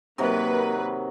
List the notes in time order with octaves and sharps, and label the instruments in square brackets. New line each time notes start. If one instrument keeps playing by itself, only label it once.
[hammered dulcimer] C3 D#3 F#3 [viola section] A#3 B4